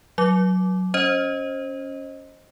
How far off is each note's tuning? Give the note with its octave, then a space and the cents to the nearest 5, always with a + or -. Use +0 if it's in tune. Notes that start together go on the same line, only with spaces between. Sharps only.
F#3 +0 D6 -5
C#4 +0 C5 +25 D#5 +0